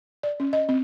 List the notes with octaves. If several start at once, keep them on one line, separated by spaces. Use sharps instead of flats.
D5
C#4
D#5
C4